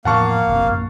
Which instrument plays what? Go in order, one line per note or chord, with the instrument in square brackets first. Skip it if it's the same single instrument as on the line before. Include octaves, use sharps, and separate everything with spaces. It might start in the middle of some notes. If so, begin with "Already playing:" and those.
[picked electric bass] E2 A2 F3 [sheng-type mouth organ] A#3 F5 [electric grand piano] F#5 A5 C#6
[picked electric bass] F1 A#1 C3
A#1 F#2 A#3